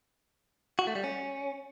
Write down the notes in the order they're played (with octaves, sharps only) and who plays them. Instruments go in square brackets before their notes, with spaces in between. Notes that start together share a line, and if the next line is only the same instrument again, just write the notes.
[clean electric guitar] F#4
A3
G3
C#4